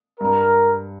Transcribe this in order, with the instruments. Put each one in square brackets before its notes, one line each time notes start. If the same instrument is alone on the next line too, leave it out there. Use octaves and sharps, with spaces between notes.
[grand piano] G2 [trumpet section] A#4